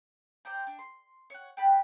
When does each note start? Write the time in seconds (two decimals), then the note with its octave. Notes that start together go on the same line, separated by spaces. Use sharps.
0.45 C5 D5 G5 A#5
0.67 D4
0.79 C6
1.30 C#5 F#5
1.57 G5 A5 B5 F#6